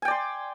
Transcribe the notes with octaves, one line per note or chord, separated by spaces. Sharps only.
D5 G5 G#5 C6